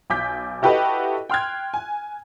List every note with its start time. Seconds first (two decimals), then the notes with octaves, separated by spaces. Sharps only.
0.10 B1 G#5 D6 G6 B6
0.62 E4 F#4 G4 A4 B4 D#5
1.30 G5 C6 F6 F#6 G#6
1.74 G#5